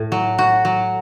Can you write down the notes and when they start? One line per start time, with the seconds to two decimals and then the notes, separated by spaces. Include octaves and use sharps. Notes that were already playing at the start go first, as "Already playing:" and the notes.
Already playing: A2
0.12 F#3
0.38 F#4
0.65 F#3